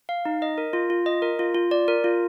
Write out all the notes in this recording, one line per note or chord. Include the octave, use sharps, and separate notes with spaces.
F5
D#4
D#5
A#4
F4
F4
D#5
A#4
F4
F4
D5
A#4
F4